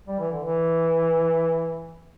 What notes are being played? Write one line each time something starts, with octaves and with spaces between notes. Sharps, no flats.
G3
E3
D3
E3